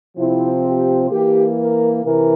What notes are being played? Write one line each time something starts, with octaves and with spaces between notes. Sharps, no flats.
C3 F3 C4 E4
G4
E3 A#3 G4
A#4
C3 E3 A#4